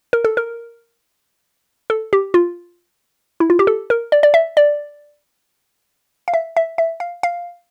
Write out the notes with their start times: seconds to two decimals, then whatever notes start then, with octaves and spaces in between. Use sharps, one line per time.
0.13 A#4
0.25 A4
0.37 A#4
1.90 A4
2.13 G4
2.34 F4
3.40 E4
3.50 F4
3.59 G4
3.67 A4
3.90 A#4
4.12 D5
4.23 D5
4.34 E5
4.57 D5
6.28 F5
6.34 E5
6.57 E5
6.78 E5
7.00 F5
7.23 F5